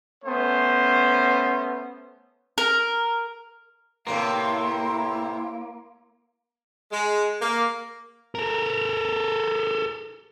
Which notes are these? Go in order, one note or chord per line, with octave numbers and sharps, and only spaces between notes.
A3 B3 C#4 C5
A#4
A2 C3 A#3 B3 F5 C6
E4
G#3
A#3
A4 A#4